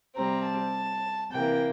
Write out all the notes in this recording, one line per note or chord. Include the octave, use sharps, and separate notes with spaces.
C3 G3 C4 A#5
A5
C3 E3 A#3 G5